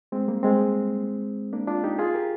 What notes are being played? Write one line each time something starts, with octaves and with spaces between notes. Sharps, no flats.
G#3 C4
G3 A#3
G#3 C4
A#3 D4
D4 F4
D#4 G4
F4 G#4
G4 A#4